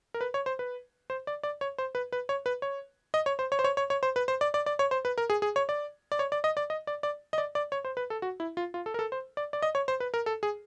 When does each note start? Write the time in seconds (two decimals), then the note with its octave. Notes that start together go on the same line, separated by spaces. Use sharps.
0.14 A#4
0.21 B4
0.34 C#5
0.46 C5
0.59 B4
1.10 C5
1.27 D5
1.43 D5
1.61 C#5
1.78 C5
1.95 B4
2.12 B4
2.29 C#5
2.46 B4
2.62 C#5
3.14 D#5
3.26 C#5
3.39 C5
3.52 C#5
3.59 C5
3.64 C#5
3.77 C#5
3.90 C#5
4.03 C5
4.16 B4
4.28 C5
4.41 D5
4.54 D5
4.66 D5
4.79 C#5
4.91 C5
5.05 B4
5.18 A#4
5.30 G#4
5.42 G#4
5.56 C#5
5.69 D5
6.12 D5
6.19 C#5
6.32 D5
6.44 D#5
6.57 D5
6.70 D#5
6.87 D5
7.03 D5
7.33 D#5
7.38 D5
7.55 D5
7.72 C#5
7.85 C5
7.97 B4
8.10 A4
8.22 F#4
8.40 E4
8.57 F4
8.74 F4
8.86 A4
8.94 A#4
8.99 A4
9.12 C5
9.37 D5
9.53 D5
9.62 D#5
9.75 C#5
9.88 C5
10.00 B4
10.14 A#4
10.26 A4
10.43 G#4